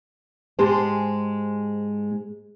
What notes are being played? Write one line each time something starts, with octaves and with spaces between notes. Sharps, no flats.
G#2 G#3 G4 C5 A5